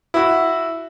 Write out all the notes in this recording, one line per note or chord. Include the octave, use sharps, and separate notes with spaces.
E4 F#4